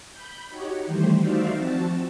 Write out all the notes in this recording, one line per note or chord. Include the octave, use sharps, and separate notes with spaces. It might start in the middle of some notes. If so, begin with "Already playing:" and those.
B5 G6
D#4 F#4 G4 C#5
D#3 E3 G3 A3 G4 C5
D#4 F#4 C5 D5 E5 F5
F3 C4 F#4 A5